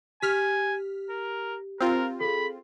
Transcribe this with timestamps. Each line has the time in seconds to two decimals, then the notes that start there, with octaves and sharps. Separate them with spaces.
0.22 G4 G#5 F6 B6
1.10 A#4
1.80 C4 F4 A#4
2.20 G#4 A4 B5